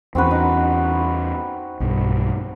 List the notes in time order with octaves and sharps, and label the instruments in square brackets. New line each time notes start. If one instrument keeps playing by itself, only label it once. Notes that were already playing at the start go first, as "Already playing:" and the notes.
[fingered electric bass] E2 C#4 [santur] C4 F#4 B4
[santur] D#4
[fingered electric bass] B1 G2